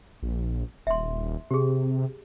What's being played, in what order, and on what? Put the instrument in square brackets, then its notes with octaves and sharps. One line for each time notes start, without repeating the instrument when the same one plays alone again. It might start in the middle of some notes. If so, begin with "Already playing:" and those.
[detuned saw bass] A#1
[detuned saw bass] D#1 [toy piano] E5 C6
[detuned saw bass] C3 [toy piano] G4 G#4